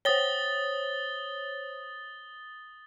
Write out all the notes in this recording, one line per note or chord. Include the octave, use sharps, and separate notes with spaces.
C5 C#5 D#6 A6 G7